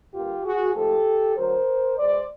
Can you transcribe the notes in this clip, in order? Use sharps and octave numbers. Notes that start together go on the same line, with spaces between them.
G2 D3 G3 A#3 F4 G4
F#4 G#4
G#2 F3 A3 G4 A4
D2 D3 F#3 A#4 C5
B2 G#3 C5 D5